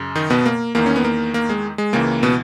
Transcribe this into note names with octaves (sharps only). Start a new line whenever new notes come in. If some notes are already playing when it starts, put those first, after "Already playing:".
Already playing: F#2 C#3
D#3 D#4
B2 B3
A#3
E2 D#3 A#3
C#4
B3
A#3
A#3
G#3
G#3
C#2 C#3 E3 A#3
B2 B3